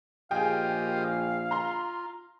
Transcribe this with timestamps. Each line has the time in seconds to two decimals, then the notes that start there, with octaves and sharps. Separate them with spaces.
0.31 A#1 F4 G4 G#4 D#5 F5 G5
1.51 F4 A#5 C6